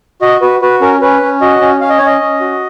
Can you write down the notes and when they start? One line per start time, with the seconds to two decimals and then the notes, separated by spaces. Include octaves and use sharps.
0.22 F#4 D#5
0.42 F#4 B4
0.61 F#4 B4
0.81 C#4 A#4
1.02 C#4 B4
1.22 C#4
1.41 F#4 D#5
1.61 C#4
1.81 C#4 F5
1.90 D#5
1.98 C#4 C#5
2.07 D#5
2.21 C#4
2.41 F#4